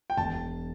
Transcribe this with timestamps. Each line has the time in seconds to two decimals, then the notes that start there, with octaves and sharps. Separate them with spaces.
0.10 G5
0.17 E1 A5